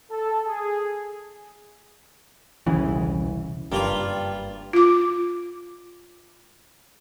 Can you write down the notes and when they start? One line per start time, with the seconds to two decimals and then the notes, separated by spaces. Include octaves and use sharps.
0.10 A4
0.47 G#4
2.67 E1 C2 C#3 E3
3.72 F#1 G2 G3 A#3 F4
4.73 F4 D6